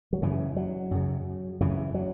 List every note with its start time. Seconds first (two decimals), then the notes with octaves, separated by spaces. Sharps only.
0.13 F#3
0.22 F#2 C#3 E3
0.56 F#3
0.91 F#2 C#3
1.61 F#2 C#3 E3
1.94 F#3